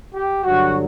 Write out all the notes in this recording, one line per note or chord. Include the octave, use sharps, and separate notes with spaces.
G4
G2 D3 F#3 F#4